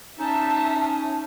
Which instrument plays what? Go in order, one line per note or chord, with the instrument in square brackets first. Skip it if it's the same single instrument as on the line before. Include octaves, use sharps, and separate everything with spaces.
[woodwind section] C#4 D#4 [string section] E5 A5